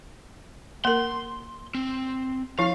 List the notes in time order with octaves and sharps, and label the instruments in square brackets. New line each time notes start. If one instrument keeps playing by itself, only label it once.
[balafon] A#3 A#4 [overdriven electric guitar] C6
[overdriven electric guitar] C4
[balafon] F3 E4 [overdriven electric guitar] F5